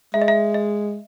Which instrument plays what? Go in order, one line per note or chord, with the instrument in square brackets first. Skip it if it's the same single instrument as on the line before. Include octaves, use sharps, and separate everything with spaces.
[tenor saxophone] G#3 [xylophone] E5
[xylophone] D#5
E5
D#5